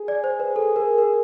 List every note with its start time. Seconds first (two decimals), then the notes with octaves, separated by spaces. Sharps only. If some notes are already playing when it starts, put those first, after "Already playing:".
Already playing: G#4
0.08 D5
0.24 C5
0.40 B4
0.56 A4
0.76 A#4
0.98 A#4